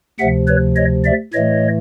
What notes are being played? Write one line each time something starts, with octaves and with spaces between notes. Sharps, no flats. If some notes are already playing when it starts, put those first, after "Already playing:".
D2 C3 F3 E5 F#5
B4 C#5
C#5 D#5
D5 E5
A2 E3 A3 C#5 D#5